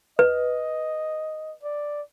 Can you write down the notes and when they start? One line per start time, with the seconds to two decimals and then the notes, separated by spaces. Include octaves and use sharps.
0.19 B4 D#5
1.63 D5